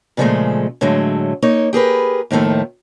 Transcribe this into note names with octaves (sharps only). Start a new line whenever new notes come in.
A#2 C#3 F3 F#3 G#3 A3
A2 D3 F#3 G#3 A3
A#3 D#4 C#5
G4 G#4 A#4 B4
D#2 A2 D#3 F3 A3